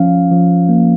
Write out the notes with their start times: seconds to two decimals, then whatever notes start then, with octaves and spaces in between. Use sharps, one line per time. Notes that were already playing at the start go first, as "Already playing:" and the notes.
Already playing: F3 C#4 F5
0.31 F3
0.69 A#3